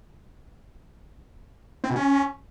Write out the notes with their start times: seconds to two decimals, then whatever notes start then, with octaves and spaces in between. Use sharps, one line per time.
1.84 C4
1.90 B2
1.96 C#4